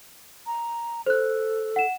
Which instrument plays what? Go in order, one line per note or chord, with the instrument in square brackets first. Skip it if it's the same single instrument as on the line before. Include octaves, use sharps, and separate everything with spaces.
[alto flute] A#5
[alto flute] A4 [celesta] C5 F#6
[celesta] F#5 E7